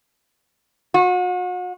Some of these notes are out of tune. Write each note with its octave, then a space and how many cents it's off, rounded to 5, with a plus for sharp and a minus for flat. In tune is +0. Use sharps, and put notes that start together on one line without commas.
F#4 -40